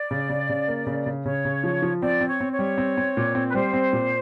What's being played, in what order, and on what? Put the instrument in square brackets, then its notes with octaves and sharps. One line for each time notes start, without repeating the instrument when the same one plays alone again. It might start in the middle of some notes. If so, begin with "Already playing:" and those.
Already playing: [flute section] D5
[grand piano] C#3
C#3
C#3
A#3
C#3
C#3
[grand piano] C#3 [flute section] C#5
[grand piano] C#3
F3
F3
[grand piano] C4 [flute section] D5
[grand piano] C4
[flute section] C#5
[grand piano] C4
[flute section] C#5
[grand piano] G3
C4
C4
A#2
C4
[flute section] B4
[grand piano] G3 [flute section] C5
[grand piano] C4
A#2